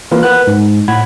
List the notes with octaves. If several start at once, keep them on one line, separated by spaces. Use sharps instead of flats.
E3 A#3 F4 A#4 B4
A#4 B4 F#5 F#6
G#2
A2 F#5 B5 G#6